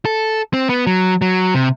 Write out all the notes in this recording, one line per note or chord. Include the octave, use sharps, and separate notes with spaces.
A4
C4
B3
F#3
F#3
C3